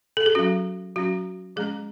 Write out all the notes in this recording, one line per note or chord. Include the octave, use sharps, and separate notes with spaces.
A4
G#4
F#3 C#4 F#4
F#3 C#4 F#4
F3 G#3 C#4 G#4